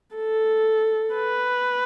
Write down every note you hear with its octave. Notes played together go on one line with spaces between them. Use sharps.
A4
B4